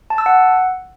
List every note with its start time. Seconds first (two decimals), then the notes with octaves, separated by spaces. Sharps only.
0.10 A5
0.18 E6
0.26 F#5